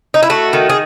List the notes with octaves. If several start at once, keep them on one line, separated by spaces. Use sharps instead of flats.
D#4
E4
A3 F#4
D#3
G#4